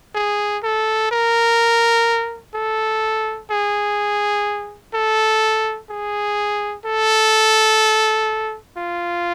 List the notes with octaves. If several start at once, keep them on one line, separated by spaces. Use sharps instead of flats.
G#4
A4
A#4
A4
G#4
A4
G#4
A4
F4